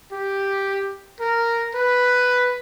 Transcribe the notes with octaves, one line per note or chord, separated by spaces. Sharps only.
G4
A#4
B4